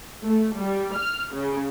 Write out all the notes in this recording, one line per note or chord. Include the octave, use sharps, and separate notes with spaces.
A3
G3
F6
C#3